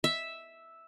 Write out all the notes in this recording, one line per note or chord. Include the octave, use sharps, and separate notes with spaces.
E5